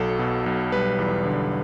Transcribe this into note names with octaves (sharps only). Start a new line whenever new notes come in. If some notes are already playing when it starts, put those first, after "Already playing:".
Already playing: B1 F#3 A4
B2
B1
G3 B4
E2
D3